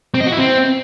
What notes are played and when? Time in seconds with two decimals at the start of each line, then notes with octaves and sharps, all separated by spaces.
0.14 C4
0.20 D#5
0.26 F#4
0.32 E4
0.38 C4